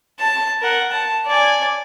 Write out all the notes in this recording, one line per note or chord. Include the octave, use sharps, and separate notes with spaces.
A5
A#4 F#5
A5
D5 G#5